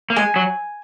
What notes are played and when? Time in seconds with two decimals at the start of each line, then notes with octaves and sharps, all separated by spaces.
0.10 A#3
0.16 G#3 G#5
0.36 F#3